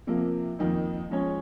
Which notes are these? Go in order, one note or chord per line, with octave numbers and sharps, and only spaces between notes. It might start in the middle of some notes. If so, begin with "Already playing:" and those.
C3 F3 A#3
F2 D#3 A#3 D#4
F3 G#3 C#4 G#4 C#5